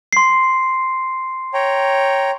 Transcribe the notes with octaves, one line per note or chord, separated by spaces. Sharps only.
C6 C7
C#5 G5 A#5